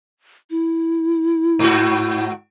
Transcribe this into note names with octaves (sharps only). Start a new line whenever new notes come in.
E4
G#2 F#4